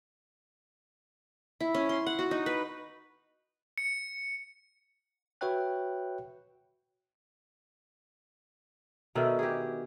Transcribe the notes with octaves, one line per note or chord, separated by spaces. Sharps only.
E4
C#4
C6
F#5
F#4
D#4
B4
C#7
F#4 B4 C#5 E5 G5 F#6
B2 D3 D#3 E5
G4 G#4